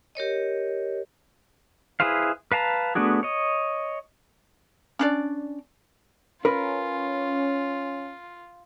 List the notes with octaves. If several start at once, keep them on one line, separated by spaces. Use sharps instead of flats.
G4 A#4 C#5 D#5
E4 G#4 B4 C5 F5
B4 F5 A5 A#5
A3 B3 D4 F#4 G#4
C#5 D#5
C#4 D4 D5
C#4 F4 A#4 B4